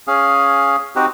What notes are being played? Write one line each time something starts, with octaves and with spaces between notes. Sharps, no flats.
C#4 G#4 F5
C4 D#4 F#4 G4